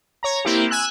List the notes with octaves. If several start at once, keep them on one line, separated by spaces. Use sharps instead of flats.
C#5 A#5
A#3 C4 E4 G4
G#5 E6 F#6